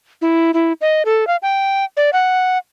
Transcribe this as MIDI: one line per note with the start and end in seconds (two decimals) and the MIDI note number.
0.22 0.51 64
0.54 0.73 64
0.81 1.03 75
1.05 1.27 69
1.27 1.36 77
1.42 1.85 79
1.97 2.10 74
2.13 2.58 78